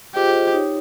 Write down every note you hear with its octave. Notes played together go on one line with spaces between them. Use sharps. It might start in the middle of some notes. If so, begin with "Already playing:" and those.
F4 G4 G#4 C5 D#5
D#4 G4 C#5